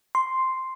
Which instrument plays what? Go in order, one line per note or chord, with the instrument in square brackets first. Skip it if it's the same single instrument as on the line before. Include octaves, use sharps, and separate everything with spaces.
[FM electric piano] C6